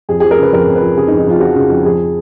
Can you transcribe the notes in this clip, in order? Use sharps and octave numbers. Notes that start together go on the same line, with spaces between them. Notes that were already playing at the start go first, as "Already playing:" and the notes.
F2 G#4
F3 G#4
A#4
C#3 B4
F2 A#4
F2
B4
F3
C#3 G#4
D#4
F2
D#4
F2 F4
F3 F#4
C#3
F2
F3 G#4